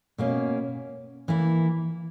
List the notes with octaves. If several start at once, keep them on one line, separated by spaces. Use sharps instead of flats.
B2 A#3 C#4
E3 A#3 E4